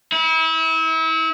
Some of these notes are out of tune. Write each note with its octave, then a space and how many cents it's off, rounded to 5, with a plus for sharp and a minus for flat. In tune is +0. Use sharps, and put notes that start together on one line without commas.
E4 -35